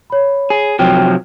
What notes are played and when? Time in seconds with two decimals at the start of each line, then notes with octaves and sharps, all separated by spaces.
0.10 C#5 B5
0.50 G#4
0.79 C3 F3 F#3 G5